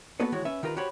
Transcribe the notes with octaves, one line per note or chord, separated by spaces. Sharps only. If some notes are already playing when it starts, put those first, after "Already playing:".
A#3 B3 F#4 A4 B4
D#3 E3 G#3 F#4 C#5
C#4 B4 E5
D#3 F4 G4 A#4 B4
F#4 G4 C5 C#5 B5